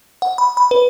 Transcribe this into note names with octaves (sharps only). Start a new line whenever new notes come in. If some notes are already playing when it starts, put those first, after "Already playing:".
F#5
B5
B5
B4